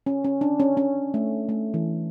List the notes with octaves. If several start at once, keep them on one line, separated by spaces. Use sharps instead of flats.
C#4
C#4
D4
C#4
C#4
A3
A3
E3